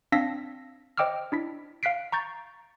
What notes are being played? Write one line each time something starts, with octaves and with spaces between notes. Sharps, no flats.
C4 D4 F5 E6 A#6 B6
C5 D#5 G5 D6 E6 F6
D4 E4 B6
F5 F#6 B6 C7 D7
A#5 C#6 G6 A6